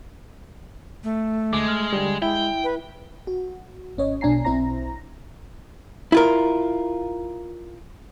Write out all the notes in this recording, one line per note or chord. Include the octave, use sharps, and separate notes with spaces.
A3
D2 G#3 D6
F6
D3 G3
G#3 E4 G5
B4
F#4
G#1 C#4 C#5 D#5
B1 B2 D4 G#5 A#5 C7
B1 C4 E4 C5 A#5 A#6
E4 F4 A#4